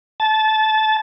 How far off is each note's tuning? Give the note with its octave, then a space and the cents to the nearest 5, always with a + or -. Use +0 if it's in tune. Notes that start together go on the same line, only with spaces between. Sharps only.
A5 -20